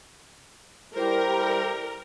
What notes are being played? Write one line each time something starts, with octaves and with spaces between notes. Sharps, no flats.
G3 E4 G4 A#4 C5